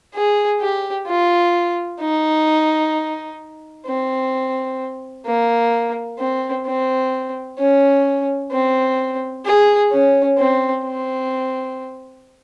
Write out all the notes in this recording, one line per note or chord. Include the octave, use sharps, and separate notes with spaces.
G#4
G4
F4
D#4
C4
A#3
C4
C4
C#4
C4
G#4
C#4
C4
C4